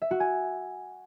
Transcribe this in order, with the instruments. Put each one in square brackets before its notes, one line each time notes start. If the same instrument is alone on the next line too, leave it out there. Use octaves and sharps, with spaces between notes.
[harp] E5
F#4
G#5